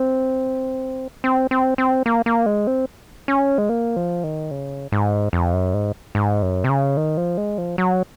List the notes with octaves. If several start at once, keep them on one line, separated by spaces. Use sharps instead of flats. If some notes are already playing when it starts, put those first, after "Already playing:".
Already playing: C4
C4
C4
C4
A#3
A#3
G#3
C4
C#4
G#3
A#3
F3
D#3
C#3
G#2
F2
F#2
G#2
G#2
F#2
C3
C#3
D#3
F3
G#3
F3
F#3